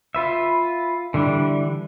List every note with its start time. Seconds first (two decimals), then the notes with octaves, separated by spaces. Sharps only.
0.15 F4 B4 E5
1.14 D3 E3 G3 D4